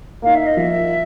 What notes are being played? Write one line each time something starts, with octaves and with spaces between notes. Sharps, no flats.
A#3 D#4 F5
E5
D#5
F3 E5